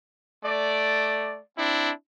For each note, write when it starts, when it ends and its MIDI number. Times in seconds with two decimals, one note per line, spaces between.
0.44 1.39 57
0.44 1.39 74
1.57 1.91 60
1.57 1.91 62
1.57 1.91 64